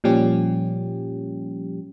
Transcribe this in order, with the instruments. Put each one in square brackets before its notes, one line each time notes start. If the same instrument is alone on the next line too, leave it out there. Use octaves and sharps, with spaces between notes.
[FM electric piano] A#2 F3 G3 C#4 G4